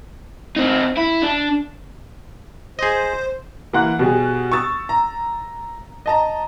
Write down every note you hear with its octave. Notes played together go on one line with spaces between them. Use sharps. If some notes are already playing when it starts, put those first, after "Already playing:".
C4 D#4
E4
D4
G#4 C5 D#5
E3 A#3 F#5 C6 F#6
B2 G3 G#4
C#6 D#6 E6 A6
A#5
D#5 A5 A#5